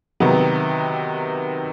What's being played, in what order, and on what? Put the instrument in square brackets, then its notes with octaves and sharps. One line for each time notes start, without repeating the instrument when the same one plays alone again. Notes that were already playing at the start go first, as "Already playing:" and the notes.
[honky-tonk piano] C3 D#3 F#3 B3